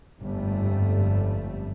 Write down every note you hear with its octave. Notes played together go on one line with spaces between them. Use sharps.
G1 F2 G#2 G3 A3